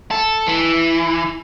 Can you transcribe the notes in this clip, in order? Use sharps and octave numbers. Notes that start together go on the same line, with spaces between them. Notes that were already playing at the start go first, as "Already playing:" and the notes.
A4
E3